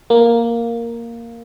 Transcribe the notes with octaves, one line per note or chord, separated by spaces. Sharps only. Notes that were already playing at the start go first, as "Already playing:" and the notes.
A#3